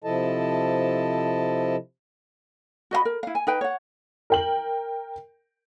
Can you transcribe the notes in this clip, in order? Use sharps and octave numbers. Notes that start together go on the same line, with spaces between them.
C3 F3 E4 A4 D#5 A5
F#4 D#5 F5 B5
A#4
E4 F5
G#5
D#4 B4 G5
C#5 F#5
A#4 G5 F#7